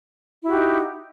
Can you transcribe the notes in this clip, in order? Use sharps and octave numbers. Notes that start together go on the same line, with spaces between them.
D#4 E4 F#4 G4